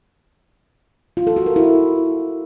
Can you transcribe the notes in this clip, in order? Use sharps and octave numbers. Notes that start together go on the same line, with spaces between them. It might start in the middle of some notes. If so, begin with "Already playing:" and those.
F4
A4
F#4
A#4
E4